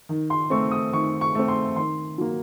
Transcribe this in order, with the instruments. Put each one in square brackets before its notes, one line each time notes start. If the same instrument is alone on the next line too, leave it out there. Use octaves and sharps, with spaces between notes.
[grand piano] D#3
C6
A3 C4 C#6
D#6
D#3 C#6
C#6
A3 C4
C6
D#3 C6
F#3 A#3